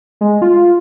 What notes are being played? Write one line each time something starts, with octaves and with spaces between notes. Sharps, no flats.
G#3
F4